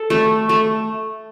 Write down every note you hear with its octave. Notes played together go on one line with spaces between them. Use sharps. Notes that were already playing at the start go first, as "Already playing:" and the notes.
Already playing: A4
A3
A3